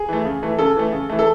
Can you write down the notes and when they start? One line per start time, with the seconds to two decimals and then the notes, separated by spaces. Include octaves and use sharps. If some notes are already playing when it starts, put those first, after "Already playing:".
Already playing: G#4
0.09 E3 A3
0.25 C#3
0.43 E3 A3
0.59 C#3 A4
0.76 E3 A3
0.92 C#3
1.09 E3 A3
1.19 A4